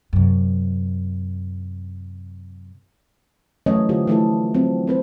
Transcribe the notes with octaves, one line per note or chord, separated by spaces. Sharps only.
F#2 C3
E3 F#3 A3 C#4 C#5 D#5
D3 A3 F4 G4 C5
E3 F3 A3 E4 F#4 A4
F#3 C4 F#4
C4 B4 C5